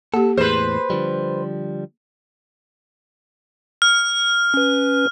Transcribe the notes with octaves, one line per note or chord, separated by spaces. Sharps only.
A#3 G4 A4
E2 A2 G#4 B4 C5
D3 F3 G3
F6
C#4 B4